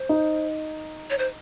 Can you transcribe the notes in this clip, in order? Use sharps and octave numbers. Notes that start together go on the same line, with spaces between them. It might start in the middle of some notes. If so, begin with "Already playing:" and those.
Already playing: C5
D#4
C#5
C5